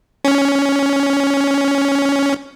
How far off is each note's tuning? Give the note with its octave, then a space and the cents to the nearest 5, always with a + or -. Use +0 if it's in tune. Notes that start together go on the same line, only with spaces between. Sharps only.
C#4 +10